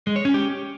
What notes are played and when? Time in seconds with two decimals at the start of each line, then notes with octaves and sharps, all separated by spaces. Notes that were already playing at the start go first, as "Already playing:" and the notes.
0.07 G#3
0.16 C#5
0.25 C#4
0.34 G4